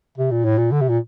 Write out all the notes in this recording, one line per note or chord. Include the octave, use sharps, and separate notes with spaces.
C3
A#2
A2
A#2
D3
C3
A#2